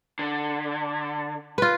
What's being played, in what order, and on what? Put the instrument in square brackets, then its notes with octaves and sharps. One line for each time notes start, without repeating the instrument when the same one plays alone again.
[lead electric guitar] D3
[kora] F4 B4